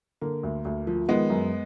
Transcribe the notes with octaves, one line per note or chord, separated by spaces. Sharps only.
D3 A#3
D2
D2
F3
D#3 G#3 B3
F#2